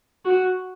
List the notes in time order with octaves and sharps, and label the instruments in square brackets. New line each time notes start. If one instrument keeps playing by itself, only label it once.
[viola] F#4